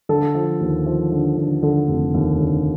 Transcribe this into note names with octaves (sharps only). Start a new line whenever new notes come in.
D3 A4
F3
D#2
F3
D3
D3
D3 A4
F1
D#2
D3